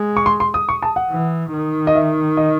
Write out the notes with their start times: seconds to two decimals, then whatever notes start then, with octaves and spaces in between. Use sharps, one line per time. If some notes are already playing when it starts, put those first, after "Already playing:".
Already playing: G#3
0.17 C#6
0.26 C6
0.40 C6
0.54 D#6
0.69 C#6
0.82 A5
0.96 F#5
1.11 E3
1.53 D#3
1.87 D#5
1.95 E5
2.37 D#5